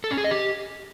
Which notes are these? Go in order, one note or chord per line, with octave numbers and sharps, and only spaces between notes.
A4
C#4
G#4
D#5
G4